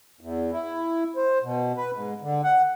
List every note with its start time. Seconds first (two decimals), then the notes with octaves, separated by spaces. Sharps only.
0.21 E2
0.52 E4
1.16 C5
1.43 B2
1.77 B4
1.94 G#2
2.22 D3
2.44 F#5